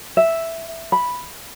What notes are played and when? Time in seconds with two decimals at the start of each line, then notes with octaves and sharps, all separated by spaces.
0.17 E5
0.92 B5